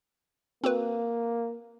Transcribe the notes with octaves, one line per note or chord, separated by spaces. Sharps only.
A#3 C4 F#4 B4